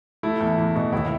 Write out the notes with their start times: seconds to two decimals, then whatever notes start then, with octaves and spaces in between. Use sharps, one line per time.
0.23 A3 E4
0.41 E2
0.58 E2
0.76 B2
0.92 D#2 E4